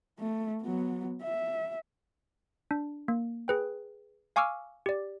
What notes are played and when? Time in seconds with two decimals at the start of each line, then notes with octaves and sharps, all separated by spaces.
0.19 A3
0.62 F#3 B3
1.23 E5
2.71 D4
3.08 A#3
3.48 G#4 B4 G5
4.36 F5 G#5 C#6 D6 E6 F6
4.86 G4 D5